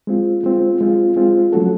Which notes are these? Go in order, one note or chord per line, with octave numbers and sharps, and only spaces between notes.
G#3 C4 F4
G#3 C4 F4
G#3 C4 F4
G#3 C4 F4
F#3 A3 C#4 F#4 A4